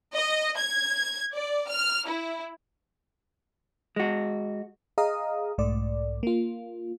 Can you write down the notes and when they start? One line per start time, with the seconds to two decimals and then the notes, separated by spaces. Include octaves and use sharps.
0.14 D#5
0.57 G#6
1.34 D5
1.67 F6
2.06 E4
3.96 G#3 F#4
4.98 G#4 D#5 F5 A#5 D#6
5.58 B1 G#2 A3 D5
6.23 A#3 F4